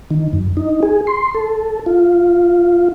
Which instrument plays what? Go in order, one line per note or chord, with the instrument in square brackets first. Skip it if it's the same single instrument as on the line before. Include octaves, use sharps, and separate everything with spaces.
[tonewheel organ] D#3
F#2
D#4
G#4
C6
A4
F4